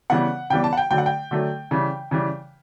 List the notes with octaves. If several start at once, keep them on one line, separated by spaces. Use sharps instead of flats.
C#3 E3 G3 B3 F#5
C#3 E3 G3 B3 G5
A5
F#5
G5
D3 F#3 A3 G5
F#5
G5
D3 F#3 A3
C#3 E3 G3
C#3 E3 G3